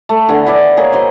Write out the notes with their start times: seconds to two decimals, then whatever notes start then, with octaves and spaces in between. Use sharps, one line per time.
0.09 A3
0.28 D3 E3 B3 G#4
0.46 B3 E4 B4 D5
0.77 A#3 G#4 C#5 G#5
0.92 F#4 C5 D#5 C6